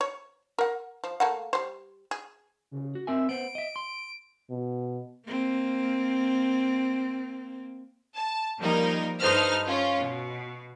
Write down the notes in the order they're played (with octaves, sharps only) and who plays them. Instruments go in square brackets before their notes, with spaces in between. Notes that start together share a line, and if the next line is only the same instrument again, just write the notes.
[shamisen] C#5
A#4 F#5
F3
A3 A#3 F#5
G3 C5
G#4
[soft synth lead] C#3
[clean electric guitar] F#4
[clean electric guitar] C4 A#4 G#5 [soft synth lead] E5
[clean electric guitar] B3 C5 [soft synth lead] D7
[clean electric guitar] D#5 E5
C6
[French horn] B2
[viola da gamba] A#3 C4
[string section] A5
D#3 F3 G3 A#3 D#4 A#4
G2 D#4 A4 B4 C5 F6
C#4 F4
B2